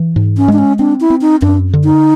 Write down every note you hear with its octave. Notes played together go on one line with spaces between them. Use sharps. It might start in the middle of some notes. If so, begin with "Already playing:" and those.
Already playing: E3
G#2
C#4
G#3 D4
C#4
C4 D4
E4
C4
D#4
F#2 D4
D3
D#4